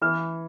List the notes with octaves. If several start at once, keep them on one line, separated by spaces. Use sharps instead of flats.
E3 B4